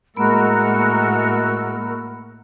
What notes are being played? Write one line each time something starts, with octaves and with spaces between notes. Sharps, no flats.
A2 G#3 A#3 F#4 A#4 B5 E6